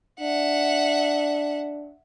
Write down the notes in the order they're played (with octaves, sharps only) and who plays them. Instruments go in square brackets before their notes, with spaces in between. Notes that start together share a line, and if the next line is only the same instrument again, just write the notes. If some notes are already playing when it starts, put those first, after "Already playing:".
[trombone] D4 [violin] E5 F#5